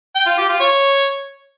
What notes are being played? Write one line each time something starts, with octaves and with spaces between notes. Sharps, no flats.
G5
F4
G4
F4
C#5